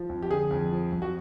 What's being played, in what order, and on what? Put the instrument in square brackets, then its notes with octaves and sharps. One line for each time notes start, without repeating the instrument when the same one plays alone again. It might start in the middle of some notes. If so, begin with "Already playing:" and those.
Already playing: [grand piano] F3
F2
G4
D3 G#4
F2
F3
F2
F#4